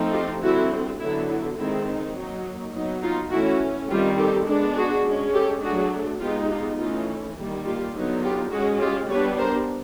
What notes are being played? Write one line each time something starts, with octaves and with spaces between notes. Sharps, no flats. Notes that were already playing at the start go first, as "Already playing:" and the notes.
Already playing: F3 A3 C4 D#4
F4 G4
D3 G3 C4 E4 F#4
D3 F#3 B3 E4
E4
D#3 G#3 C4 D#4 E4
D#4
F#3 A#3 D#4
F#3 B3 D#4
D#4 F4
E3 A3 C#4 E4 F#4
D#3 G3 C4 F4 G4
G4 A4
G#3 B3 D4
F#4 G#4
G#3 C#4
G4 A4
F#3 A3 D4 F#4 G#4
G#3 B3 D#4 F4 G4
F4 G4
E3 A3 C#4 D#4 F4
D#3 G3 A#3
F4 G4
D3 F#3 B3 D#4
F4 G4
G#3 C#4 F#4 G#4
F4 G4
G3 B3 D4 B4 C#5
A#4 C5